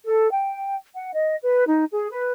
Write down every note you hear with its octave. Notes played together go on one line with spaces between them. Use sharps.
A4
G5
F#5
D#5
B4
D#4
G#4
B4